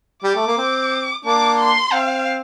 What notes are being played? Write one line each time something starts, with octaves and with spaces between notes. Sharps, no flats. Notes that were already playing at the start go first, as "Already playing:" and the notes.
G3 D6
A3
A#3
C4
A#3 D4 D6
C6
C4 F5